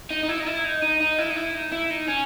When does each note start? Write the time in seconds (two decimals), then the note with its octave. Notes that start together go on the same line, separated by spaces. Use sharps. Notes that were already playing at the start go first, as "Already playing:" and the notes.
0.10 D#4
0.24 D#4
0.29 E4
0.40 D#4
0.47 E4
0.65 D#4
0.82 D#4
1.01 D#4
1.19 E4
1.30 D#4
1.36 E4
1.54 D#4
1.72 E4
1.90 D#4
2.08 C#4